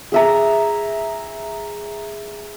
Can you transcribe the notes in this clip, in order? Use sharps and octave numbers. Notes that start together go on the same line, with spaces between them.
G#4 E5 A#5